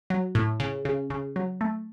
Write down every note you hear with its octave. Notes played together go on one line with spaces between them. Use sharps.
F#3
A2
C#3
C#3
C#3
F#3
A3